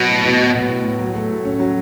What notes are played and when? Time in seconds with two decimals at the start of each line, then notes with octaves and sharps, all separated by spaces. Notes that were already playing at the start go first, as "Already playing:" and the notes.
Already playing: B2 F#3 B3
0.09 A2
0.24 A2
0.39 F#3
0.54 B3
0.68 A2
0.84 A2
0.99 F#3
1.14 A3
1.30 A2
1.45 C#4
1.60 F#3